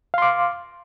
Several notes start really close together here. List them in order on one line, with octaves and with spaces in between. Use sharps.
F5 C6 D6